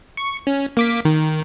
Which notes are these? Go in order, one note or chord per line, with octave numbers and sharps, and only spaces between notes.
C#6
C#4
A#3 D6 B6
D#3